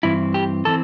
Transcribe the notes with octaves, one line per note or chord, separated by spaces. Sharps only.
G2 E3 C4 E4
G4
E3 C4 A4